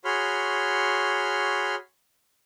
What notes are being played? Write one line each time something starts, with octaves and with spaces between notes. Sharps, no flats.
F#4 G#4 C#5 B5 C6 F6